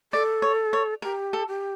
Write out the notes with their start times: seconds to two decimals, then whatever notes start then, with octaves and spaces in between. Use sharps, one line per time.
0.13 A4 D5
0.42 C#5
0.73 C#5
1.02 G4 A#4
1.33 A4
1.48 G4